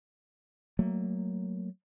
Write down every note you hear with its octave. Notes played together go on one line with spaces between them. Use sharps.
F#3 A3 A#3